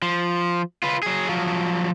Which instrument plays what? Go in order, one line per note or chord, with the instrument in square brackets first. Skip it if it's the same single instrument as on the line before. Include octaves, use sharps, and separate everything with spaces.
[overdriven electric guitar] F3
F4 B4
F#3 G#4
F3 F#3